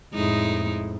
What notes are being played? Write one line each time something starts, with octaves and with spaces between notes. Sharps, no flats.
F2 A2 G#3 D#4 E4